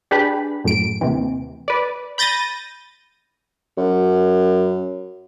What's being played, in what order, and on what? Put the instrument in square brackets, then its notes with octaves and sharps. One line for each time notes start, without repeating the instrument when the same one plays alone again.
[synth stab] D4 G4 G#4 B4 B5
F#2 A2 D7
D#2 C3 E3
B4 D5
B5 G6 A6 A#6 D#7
[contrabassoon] F#2